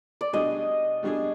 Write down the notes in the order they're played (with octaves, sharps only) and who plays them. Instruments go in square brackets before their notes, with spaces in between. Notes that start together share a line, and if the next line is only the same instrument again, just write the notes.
[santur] D5
[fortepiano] B2 G3 D4 G#4 [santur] D#5
[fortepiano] B2 G3 D4 G#4